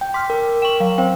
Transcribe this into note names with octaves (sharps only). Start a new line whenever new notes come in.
G5
C6 D6 F6 B6
A#4
G5 C#6 E7 F#7
F#3 F5
C4 C5 F5 G5